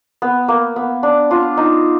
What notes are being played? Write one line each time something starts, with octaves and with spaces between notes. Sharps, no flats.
B3
A#3
B3
D4
D4 F4
D#4